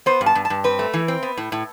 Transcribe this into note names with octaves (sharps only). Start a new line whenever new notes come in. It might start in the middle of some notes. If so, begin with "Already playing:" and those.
B3 C5
G2
A5
G2
A5
G2
C4 B4
A3
E3
C4
B3
A2
A2